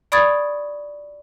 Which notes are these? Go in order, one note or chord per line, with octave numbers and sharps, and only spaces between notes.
D5 B5 C#6 D#6 G#6 A6